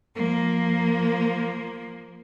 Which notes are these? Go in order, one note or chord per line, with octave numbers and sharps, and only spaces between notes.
F3 A#3